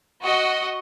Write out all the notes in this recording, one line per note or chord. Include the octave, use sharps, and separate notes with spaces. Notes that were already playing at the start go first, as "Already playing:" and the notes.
F#4 D#5